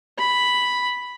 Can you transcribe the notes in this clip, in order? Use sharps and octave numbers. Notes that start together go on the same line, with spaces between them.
B5